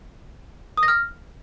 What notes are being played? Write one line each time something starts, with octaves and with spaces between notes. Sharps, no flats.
D#6
A#6
F6